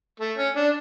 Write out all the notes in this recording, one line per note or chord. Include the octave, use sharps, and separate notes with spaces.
A3
C#4
D4